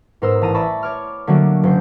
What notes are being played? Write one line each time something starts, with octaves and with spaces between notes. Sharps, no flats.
G#2 B3 A#4 C5 D#6 E6
A1 A5 A#5 D#7
D5 E5 A5 B5 C#6 A#6
C#5 D6 F6
D3 F#3 A3 A#3 D4 F#4
F#1 G6 C7